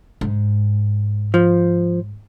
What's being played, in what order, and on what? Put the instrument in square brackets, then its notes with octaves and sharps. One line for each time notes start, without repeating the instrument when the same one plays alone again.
[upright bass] G#2
[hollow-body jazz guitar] F3